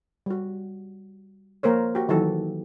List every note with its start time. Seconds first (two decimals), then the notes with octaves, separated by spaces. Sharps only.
0.26 G3 F#4
1.63 F3 A#3 A#4 C5 C#5
1.95 F#4 G4
2.09 D#3 E3 F#3 F#4 A4